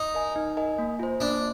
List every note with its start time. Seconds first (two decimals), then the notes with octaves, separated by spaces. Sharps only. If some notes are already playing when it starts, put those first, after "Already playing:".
Already playing: D#4
0.15 A#4 D#5 G#5
0.36 D#4
0.57 A#4 D#5 G#5
0.78 A#3
0.99 F4 C5
1.20 A#3 D4